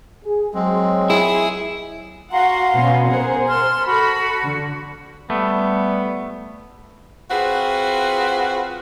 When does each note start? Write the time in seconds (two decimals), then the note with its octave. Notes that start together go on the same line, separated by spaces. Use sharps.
0.24 G#4
0.54 F#3 G#3 C4
1.10 E4 G#4
2.32 F#4 F5 F#5 A#5 C6
2.75 B2 B3 C#4
3.09 G#4 A#4 C5 F#5
3.48 A5 C6 F6
3.84 F#4 A4 B5
4.43 D3
5.30 G3 A3 B3
7.31 C4 F4 F#4 G#4 B4